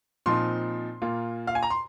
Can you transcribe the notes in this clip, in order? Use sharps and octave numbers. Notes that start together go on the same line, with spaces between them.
A#2 F3 C4 D#4 C6
A#2 A#3 F4
F5
G#5
A#5
C6